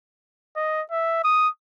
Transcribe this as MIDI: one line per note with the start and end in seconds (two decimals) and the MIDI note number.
0.57 0.82 75
0.91 1.22 76
1.24 1.49 87